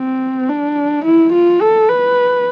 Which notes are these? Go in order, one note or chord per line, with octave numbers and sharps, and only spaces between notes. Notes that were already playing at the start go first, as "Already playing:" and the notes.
Already playing: C4
D4
E4
F4
A4
B4